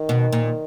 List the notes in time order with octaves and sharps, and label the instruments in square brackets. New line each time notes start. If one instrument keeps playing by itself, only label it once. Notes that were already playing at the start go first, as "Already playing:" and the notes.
Already playing: [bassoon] D#3
[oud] B2
A#2